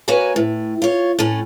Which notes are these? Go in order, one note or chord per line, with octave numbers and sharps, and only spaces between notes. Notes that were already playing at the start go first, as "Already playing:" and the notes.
A#3 F#4 B4 C#5 G#5
A2
F4 C#5
A2 A3 C#4